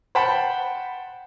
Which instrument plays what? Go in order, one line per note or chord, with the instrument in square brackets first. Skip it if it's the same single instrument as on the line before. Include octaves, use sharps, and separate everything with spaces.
[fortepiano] C5 F#5 G5 A5 B5